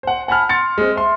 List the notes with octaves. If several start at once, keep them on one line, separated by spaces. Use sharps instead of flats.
C5 F#5
F#5 G#5 A5 B5 F6
C6 A6 C#7
G#3 C4
E5 C6